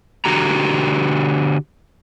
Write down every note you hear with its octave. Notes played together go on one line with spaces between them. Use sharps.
D3 F#4 G4 A#5